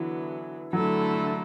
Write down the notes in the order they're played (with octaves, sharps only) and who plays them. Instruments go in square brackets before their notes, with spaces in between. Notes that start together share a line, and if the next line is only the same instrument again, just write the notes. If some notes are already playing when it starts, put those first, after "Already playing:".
Already playing: [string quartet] D3 F#3 B3 [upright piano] E3
[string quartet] D3 A3 E4 A4 [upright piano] F#3